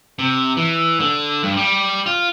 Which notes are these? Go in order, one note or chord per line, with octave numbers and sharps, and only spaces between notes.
C3
E3
D3
G2
G3
F4